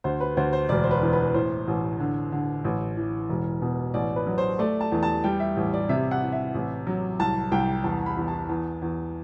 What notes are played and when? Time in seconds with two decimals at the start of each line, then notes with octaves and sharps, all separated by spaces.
0.04 D2 C5
0.21 B4
0.37 D2 C5
0.53 C5
0.69 E1 D5
0.83 C5
0.91 B4
1.02 E2
1.13 B4
1.34 A2 C5
1.67 A1
2.00 D3
2.32 D3
2.64 A1
2.97 E3
3.29 E1
3.62 B2
3.94 A1 D5
4.16 B4
4.27 F#3
4.38 C5
4.59 A3 D5
4.81 A5
4.92 E2
5.03 A5
5.24 G3 G5
5.40 E5
5.57 A1
5.74 D5
5.89 C3 E5
6.11 F#5
6.22 E3
6.32 E5
6.55 A1
6.87 F#3
7.19 C2 A5
7.52 C2 G5
7.84 E2 A5
8.06 B5
8.17 E2
8.28 A5
8.49 E2
8.82 E2